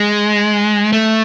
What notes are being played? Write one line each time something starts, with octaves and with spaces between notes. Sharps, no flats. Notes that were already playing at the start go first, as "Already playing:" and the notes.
Already playing: G#3
A3